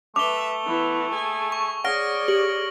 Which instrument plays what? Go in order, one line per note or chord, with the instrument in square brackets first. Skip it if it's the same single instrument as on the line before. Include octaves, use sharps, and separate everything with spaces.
[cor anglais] A3 [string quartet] B4 E5 [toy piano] D6 [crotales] F7 G7
[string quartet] E3 B3
G#4 G#5
[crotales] C#6
[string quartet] G#4 C#5 D5 [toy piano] F#5 [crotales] F6 A#6 D7
[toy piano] G4 [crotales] F#7